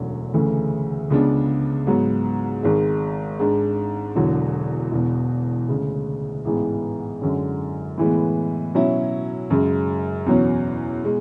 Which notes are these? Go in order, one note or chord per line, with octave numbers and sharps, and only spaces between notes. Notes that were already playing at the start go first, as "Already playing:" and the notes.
Already playing: E1 D2 D3 F#3 C#4
D2 C#3 E3 A3
C#2 C#3 G#3 B3 D4
G#2 F#3 B3
G#1 G#2 G#3
G#2 G#3 D4
E1 E2 D3 F#3
E1 E2 B2
D2 C#3 G#3
A1 G#2 E3 G#3 B3
F#2 D3 G#3 C#4
A2 E3 G#3 B3
B2 F#3 C#4 E4
F#2 C#3 G#3
E2 B2 F#3 C#4
B2 G#3